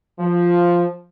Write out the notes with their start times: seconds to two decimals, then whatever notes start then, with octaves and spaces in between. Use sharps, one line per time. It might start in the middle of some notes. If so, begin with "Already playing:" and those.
0.19 F3